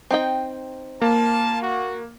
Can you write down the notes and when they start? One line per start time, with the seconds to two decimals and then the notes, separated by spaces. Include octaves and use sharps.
0.11 C4 D#4 G5
1.02 A#3 F4 A5
1.62 F#4